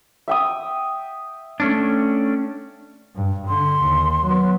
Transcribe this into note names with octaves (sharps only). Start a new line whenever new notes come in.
E5 G5 D#6
A3 C#4 D4
G2
D3 C6
D#2
F#3 B3